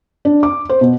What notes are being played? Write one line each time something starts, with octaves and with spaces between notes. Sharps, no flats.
D4
D6
C5
B2